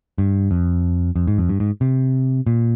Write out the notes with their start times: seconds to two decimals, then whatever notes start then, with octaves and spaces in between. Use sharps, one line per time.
0.18 G2
0.51 F2
1.16 F2
1.27 G#2
1.38 F2
1.49 G2
1.60 G#2
1.81 C3
2.47 A#2